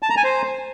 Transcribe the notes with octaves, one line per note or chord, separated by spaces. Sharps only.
A5
A#5
G#5
C5